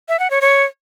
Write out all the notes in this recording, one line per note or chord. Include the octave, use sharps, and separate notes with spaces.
E5
F#5
C#5
C#5